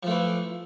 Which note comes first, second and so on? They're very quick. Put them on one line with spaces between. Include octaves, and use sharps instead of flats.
F3 A3 E3